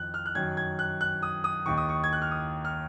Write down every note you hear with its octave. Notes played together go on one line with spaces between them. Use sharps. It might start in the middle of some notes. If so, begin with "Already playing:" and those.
Already playing: F2 D#3 F#6
F6
F#6
F#2 D#3 G#6
G#6
F#6
F#6
D#6
D#6
D#2 D#3 C#6
D#6
C#6
G#6
F#6
F6
D#6
F6